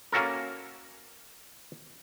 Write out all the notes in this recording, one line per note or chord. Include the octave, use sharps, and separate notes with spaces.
A#3 C#4 F#4 A4 A#4